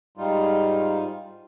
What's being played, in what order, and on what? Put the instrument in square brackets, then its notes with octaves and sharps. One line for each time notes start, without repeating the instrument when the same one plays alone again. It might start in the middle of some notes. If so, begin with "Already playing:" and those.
[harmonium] G#2 G3 D#4 F4